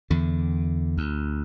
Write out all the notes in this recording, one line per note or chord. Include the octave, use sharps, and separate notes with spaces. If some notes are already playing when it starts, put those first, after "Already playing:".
E2 D3
D2